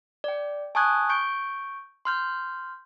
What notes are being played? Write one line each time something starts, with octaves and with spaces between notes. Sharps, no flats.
D5 G5
G#5 A5 C#6 D#6 F#6 G#6
C#6 G6 D7
C6 F6 G6